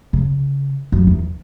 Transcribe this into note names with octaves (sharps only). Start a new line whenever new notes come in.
C#3
F#2
E2